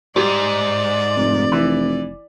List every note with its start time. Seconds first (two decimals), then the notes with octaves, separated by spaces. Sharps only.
0.16 G#2 G3 D5
1.16 F1
1.52 E3 E4